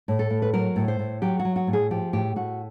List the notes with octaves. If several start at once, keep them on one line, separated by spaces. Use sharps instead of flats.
A2
A4
A2
B4
F#3 A#4
A2
C5
A2
F#3 G4
F#4
F#3
F#4
A2
G#4
F3 G4
A2 G4
A2 F#4